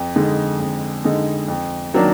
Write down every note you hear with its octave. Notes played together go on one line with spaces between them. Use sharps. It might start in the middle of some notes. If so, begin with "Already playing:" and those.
Already playing: F2
D3 G#3 D#4
F2
D3 G#3 D#4
F2
D#3 F#3 A#3 D4